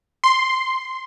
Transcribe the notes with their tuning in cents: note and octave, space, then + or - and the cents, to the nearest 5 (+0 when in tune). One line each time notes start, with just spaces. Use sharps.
C6 +0